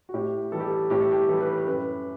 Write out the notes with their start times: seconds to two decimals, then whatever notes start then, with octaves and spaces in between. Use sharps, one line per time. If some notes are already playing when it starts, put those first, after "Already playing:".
0.09 F#4
0.14 A2 G4
0.52 E3 G3 A4
0.60 G4
0.69 A4
0.90 A2 G4
1.01 A4
1.12 G4
1.28 E3 G3 A4
1.40 B4
1.52 A4
1.67 F#2 B4